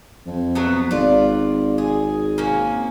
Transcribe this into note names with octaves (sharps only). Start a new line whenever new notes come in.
F2
F#3 A3 B3
G#1 F4 D5
G#4
A#3 C#4